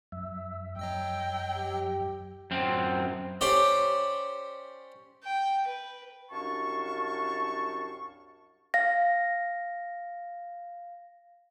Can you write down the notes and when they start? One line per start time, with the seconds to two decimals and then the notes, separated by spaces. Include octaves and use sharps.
0.12 F#2 E5
0.79 F#2 F#3 D#5 G5 E6
1.57 G4
2.51 F#2 C4
3.41 C#4 G4 C5 D5
5.24 G5
5.68 B4
6.31 C2 F#2 D4 F5 A5 C#6
8.74 F5 A#6